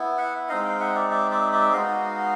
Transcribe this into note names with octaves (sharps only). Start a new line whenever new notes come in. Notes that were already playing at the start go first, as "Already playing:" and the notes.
Already playing: B3 E4
E5 F#5
G#3 C4 D#4 D#5 F5
F5 G5
E5 F#5
D5 E5
D5 E5
D5 E5
D5 E5
G#3 B3 D#4 F#4 D#5 F5